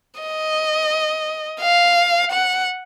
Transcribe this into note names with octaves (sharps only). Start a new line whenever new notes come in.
D#5
F5
F#5